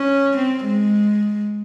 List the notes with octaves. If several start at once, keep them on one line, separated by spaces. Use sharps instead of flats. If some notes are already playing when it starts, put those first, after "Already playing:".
Already playing: C#4
C4
G#3